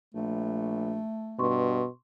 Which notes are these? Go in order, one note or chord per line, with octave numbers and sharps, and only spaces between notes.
A#1 A3
G2 B2 C6 C#6